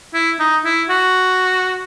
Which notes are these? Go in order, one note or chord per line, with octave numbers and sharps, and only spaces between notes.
E4
D#4
E4
F#4